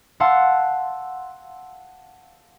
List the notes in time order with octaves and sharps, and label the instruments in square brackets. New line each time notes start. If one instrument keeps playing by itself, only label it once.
[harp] F5 F#5 A5 C6 E6 C#7